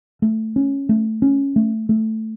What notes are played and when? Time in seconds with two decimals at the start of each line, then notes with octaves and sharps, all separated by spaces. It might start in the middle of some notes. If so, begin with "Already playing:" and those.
0.22 A3
0.56 C#4
0.89 A3
1.22 C#4
1.56 A3
1.89 A3